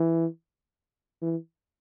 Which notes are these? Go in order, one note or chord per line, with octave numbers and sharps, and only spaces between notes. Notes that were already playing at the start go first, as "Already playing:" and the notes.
Already playing: E3
E3